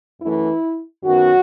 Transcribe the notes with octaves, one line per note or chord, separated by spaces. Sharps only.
F#2 E3 A3 E4
F#2 D#3 F#3 B3 F#4